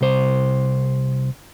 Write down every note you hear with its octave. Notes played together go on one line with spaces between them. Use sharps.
C2 C5